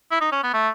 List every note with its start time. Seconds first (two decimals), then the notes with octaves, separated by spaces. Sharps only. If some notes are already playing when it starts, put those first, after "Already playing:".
0.11 E4
0.21 D#4
0.32 C#4
0.43 B3
0.54 A3